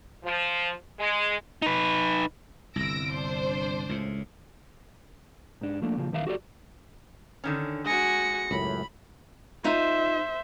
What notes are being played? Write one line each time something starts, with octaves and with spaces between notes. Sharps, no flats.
F3
G#3
D#4 B4
G1 C2 E6 A#6 D7
D4 C5
C#2 A2
G#2 D4
F3 A3 A#3 D4
F2 A#2 C#3 E3 F3
E2 D#3 E5 F5
F#4 G4 A4 D5
D3 D#3 C#4
G#3 F#4 G#5 A#6 C#7
C#2 F#2 A2 B5
D#4 F4 C5 E5